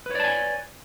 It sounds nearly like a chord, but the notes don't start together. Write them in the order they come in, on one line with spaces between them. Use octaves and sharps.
B4 C#5 D5 A5 G#5